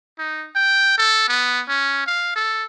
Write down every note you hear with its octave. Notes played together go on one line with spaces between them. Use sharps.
D#4
G5
A4
B3
C#4
F5
A4